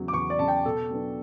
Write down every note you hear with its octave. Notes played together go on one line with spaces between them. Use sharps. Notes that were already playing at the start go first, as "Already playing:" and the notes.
Already playing: E2 C#3 F#3
D6
E2 C#6
D5
C#3 F#3 A5
G5
B2 A4
F#3 B3 D4